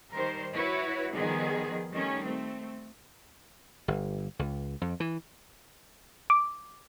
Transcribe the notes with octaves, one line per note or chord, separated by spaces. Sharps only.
D#3 G3 A#4 C5
E4 F#4 B4 C#5
D#3 F3 G3 B3 G#4
D#3 G3 A3 C#4
A3 C4
G1
C#2
F2
E3
D6